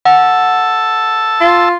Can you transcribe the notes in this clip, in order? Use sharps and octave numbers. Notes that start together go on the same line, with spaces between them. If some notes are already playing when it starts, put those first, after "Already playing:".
F#5 A5 E6
F4